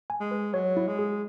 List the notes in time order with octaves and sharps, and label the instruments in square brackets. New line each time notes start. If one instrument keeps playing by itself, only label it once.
[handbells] G#5
[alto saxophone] G#3
[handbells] B4
[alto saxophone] F#3 [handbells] C#5
[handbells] E4
[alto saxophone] G#3
[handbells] G#4